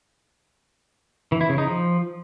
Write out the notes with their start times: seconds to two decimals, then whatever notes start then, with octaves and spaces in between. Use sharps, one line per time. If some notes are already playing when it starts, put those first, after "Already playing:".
1.32 E3
1.41 E4
1.49 C#3
1.58 D#4
1.67 F3